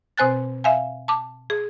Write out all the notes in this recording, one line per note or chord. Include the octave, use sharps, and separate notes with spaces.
B2 C4 C5 G#5 F#6 A6
E5 F5 G#5
A5 D6
G#4